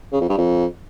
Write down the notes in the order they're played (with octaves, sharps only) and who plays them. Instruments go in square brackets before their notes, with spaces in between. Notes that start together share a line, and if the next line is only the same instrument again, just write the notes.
[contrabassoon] C#3
F2
G2
F2